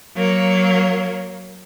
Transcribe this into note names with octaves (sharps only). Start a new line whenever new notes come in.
F#3 A#3 C#5